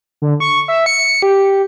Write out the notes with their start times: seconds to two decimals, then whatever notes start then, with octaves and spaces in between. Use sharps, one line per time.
0.22 D3
0.40 C#6
0.68 E5
0.86 C#7
1.22 G4